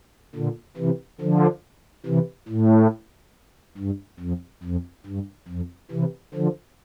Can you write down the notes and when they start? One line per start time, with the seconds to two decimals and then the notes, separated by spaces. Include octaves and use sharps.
0.35 A#2 D3
0.77 C3 E3
1.21 D3 F3
2.06 C3 E3
2.49 A2
3.77 G2
4.20 F2
4.63 F2
5.06 G2
5.48 F2
5.91 C3 E3
6.34 D3 F3